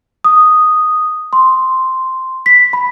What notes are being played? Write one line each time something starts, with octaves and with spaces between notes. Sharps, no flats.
D#6
C6
B6
B5